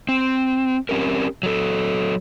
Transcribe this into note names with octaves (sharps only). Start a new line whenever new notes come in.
C4
C4 C#4 G4 A#4
F#3 A4